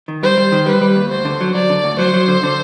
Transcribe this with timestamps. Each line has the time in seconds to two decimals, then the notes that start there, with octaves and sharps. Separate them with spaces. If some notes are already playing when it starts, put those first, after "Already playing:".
0.08 D#3
0.23 G3 C5
0.37 G3
0.52 D#3
0.66 G3 B4
0.81 G3
0.96 D#2
1.11 D2 C5
1.25 D3
1.41 F#3
1.55 F#3 D5
1.70 D3
1.84 D2
1.99 F#3 C5
2.14 F#3
2.28 D3
2.43 D3